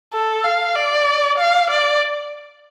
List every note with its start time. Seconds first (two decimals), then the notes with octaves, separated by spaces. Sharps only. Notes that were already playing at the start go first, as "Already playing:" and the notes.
0.13 A4
0.44 F5
0.75 D5
1.38 F5
1.70 D5